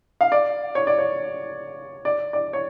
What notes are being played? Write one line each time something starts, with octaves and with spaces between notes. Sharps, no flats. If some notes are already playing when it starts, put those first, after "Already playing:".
F5
D5
C#5
D5
C#5
D5
D5
C#5